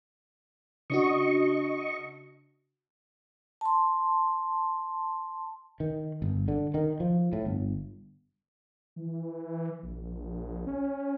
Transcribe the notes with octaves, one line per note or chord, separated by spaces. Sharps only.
C#3 D4 F#4 D#5 C#6
A5 C6
D#3
G1
D3
D#3
F3
A2
G1
E3
A#1
C#4